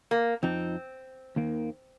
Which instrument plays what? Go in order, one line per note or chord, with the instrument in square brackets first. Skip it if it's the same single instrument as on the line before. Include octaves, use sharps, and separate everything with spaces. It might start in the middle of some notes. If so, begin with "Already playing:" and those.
[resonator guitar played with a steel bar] A#3
[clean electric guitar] F2 F3 D#4 [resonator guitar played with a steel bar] C4
[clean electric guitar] D#2 D#3 A#3